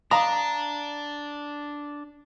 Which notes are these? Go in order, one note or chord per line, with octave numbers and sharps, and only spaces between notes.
D4 F5 A#5 D#6